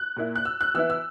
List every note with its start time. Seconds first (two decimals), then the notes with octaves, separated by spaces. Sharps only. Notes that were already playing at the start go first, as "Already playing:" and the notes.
Already playing: F#6
0.17 A#2 A#3 E4
0.36 F#6
0.45 E6
0.61 F#6
0.74 E3 B3 E4 E6
0.90 E6